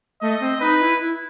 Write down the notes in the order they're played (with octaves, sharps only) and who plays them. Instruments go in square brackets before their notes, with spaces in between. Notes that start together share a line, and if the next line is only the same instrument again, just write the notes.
[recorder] A3 [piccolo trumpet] D#5
[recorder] C4
[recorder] D#4 [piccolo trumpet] B4
[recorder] E4
E4